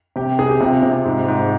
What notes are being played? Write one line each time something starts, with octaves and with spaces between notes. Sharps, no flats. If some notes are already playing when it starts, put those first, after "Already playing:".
C3 G4
C3 G#4
G4
C3 F4
C3
G#2
G#2